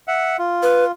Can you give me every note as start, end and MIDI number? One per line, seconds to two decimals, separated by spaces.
0.08 0.37 76
0.08 0.37 78
0.39 0.92 65
0.63 0.84 71